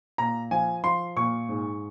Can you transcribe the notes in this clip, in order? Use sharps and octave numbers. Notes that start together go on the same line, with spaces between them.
A#2 A#5
F3 G#5
F3 C6
A#2 C#6
G#2